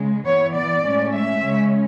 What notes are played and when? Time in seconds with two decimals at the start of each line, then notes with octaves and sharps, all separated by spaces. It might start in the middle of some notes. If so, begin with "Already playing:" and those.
Already playing: C#3 G#3
0.25 E3 B3 C#5
0.55 D5
0.84 A2 G#3 C#4
1.12 E5
1.42 C#3 G#3 C#4